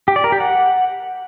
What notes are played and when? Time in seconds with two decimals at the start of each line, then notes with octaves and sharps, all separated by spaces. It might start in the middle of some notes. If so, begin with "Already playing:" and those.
0.08 G4
0.16 D5
0.24 A#4
0.32 G4
0.40 F#5